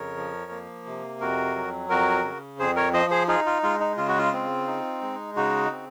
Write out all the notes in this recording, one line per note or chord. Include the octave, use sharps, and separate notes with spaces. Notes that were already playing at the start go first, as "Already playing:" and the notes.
Already playing: F2 C#3 A#4 C#5
F3
A#3
C3
F2 F#4 A#4
F#3
F2 F#4 A#4
C#3
F2 G#4 C5
A#4 C#5
F3 C5 D#5
G#4 C5
D#4 F4 G#4
F4
G#3 F4
D#4
C#3 F4
F#4
F4
C4
D#4
G#3
C#3 D#4 F#4
C4